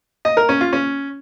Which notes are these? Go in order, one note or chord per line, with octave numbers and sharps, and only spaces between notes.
D#5
A#4
C#4
F4
C#4